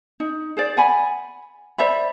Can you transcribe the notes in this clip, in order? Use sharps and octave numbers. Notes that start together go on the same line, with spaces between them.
D#4
G#4 C5 D5
F#5 G#5 B5
C5 D5 E5 B5